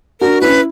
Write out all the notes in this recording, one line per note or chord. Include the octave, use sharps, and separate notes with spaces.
D4 F#4 A#4
C#4 E4 B4